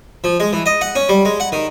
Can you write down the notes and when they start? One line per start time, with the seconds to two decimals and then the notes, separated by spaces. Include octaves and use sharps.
0.24 F3
0.40 G#3
0.53 E3
0.66 D#5
0.81 F#5
0.95 C#4
1.09 G3
1.25 G#3
1.40 F#5
1.52 D#3